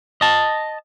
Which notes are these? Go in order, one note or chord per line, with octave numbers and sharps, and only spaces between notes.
D#5 A5